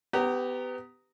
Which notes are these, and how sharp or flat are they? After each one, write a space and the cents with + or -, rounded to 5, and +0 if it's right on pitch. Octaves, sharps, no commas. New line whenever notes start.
B3 +25 G4 +0 A#5 -10